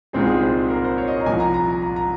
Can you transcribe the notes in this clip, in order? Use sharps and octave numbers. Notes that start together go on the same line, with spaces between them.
C2 A#2 G#3 C4 D#4 G#4
G#4
C5
A#4
C5
C#5
D#5
A#5
C2 A#2 F3 G#5
A#5
A#5
A#5
A#5
A#5